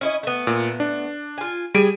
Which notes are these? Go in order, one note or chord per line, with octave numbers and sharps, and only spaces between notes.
C#4 E4 D#5
A3 B3
A#2
D4
F4 G#5
G3 G#4 D7 D#7